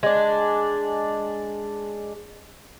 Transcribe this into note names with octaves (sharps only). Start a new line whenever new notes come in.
G#3 D4